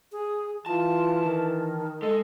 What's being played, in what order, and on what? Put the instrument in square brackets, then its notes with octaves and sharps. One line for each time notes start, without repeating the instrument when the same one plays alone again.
[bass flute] G#4
[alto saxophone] E3 [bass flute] F4 [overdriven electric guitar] A5
[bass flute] D#3
[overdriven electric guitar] G#3 [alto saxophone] A4